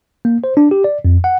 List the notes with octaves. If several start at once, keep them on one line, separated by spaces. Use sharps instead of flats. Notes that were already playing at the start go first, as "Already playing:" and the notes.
A#3
C5
D4
G4
D5
F2
F#5